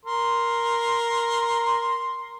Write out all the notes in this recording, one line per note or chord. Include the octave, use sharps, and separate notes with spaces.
A#4 C6